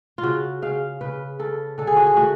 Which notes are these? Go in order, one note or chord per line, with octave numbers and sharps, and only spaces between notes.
F4
C#3 F#4
C#3 F5
C#3 B4
C#3 A4
D3 A4
G#4
F#4
G#4
A3 F#4